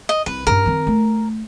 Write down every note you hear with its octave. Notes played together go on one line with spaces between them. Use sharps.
D#5
C2 B4
G2 C#4 A#4
D#3 C4
A3